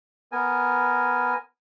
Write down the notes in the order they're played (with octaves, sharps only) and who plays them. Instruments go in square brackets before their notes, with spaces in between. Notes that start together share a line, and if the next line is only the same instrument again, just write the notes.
[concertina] B3 A#4 G#5